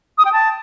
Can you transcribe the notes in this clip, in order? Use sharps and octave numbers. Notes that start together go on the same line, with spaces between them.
D#6
G5
A5